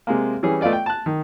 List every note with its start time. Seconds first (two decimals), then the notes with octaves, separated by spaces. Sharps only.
0.07 C3 G#3 A#3
0.43 E3 G3 C#4 G#4
0.61 A3 B3 F4 D5 D#5
0.73 G5
0.86 A5 F#6
1.06 D#3